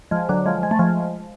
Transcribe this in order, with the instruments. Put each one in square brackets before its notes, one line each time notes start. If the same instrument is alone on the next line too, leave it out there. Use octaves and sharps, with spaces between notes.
[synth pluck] F3 G#3
D3 F#3
F3 G#3
G#3
A3
F3 G#3